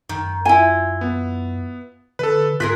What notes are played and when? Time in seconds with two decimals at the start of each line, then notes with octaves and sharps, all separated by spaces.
0.09 F#2 D#3
0.45 E4 F4 G#5
1.01 B3
2.19 D3 A4 B4
2.60 G#2 G#3 F4 G#4 A#4 F#6 B6